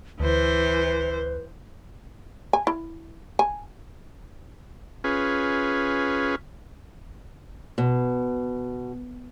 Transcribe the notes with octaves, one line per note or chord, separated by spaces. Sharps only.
D2 E3 B4 C5
G#5
E4
G#5
C#4 F4 G#4 B4
B2